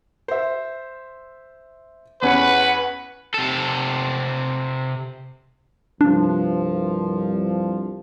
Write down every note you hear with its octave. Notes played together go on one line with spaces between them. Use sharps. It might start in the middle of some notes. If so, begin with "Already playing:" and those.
C5 E5
E2 C#4 B4 F#5
C3 A4
C2 G2 F3 D4